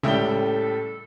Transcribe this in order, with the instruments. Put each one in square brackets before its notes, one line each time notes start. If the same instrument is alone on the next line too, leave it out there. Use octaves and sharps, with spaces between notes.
[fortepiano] C#2 E5 G5 [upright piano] A2 G3 G7 [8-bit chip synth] C#3 [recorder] A4